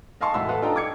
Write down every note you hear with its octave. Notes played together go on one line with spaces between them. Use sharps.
D#5 F5 G#5 A5 C6 C#6
E1 A2 E5 F#5 C6 E6
A4 B4 F5 F#5
D4 F4 A4 D#5 G5 A#5
D6 G#6 C#7